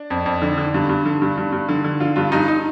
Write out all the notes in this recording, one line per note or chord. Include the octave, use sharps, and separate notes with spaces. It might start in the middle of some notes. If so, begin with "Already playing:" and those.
Already playing: D4
F2
F2
D3
D3
G2
G2
D3
G2
G2
G2
D3
D3
D3 F4
G2 F4
G2 D#4
D#4